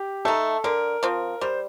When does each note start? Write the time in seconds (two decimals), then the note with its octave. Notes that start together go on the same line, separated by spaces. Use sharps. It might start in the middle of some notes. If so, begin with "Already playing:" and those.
Already playing: G4
0.25 A3 D#4 A4
0.64 D3 A#4
1.03 F3 C4
1.41 G3 C5